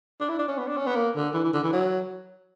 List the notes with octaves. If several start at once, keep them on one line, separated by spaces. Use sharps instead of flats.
D4
E4
D4
C#4
B3
D4
C#4
B3
A#3
D3
E3
E3
D3
E3
F#3